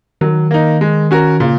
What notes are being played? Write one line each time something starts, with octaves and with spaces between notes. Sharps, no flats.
D#3 F#3
A#3 D#4
G#3
C#4 F#4 A#4
A#2 C#3